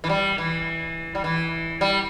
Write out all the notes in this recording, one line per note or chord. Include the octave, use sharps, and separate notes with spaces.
E3
G3
E3
G3
E3
G3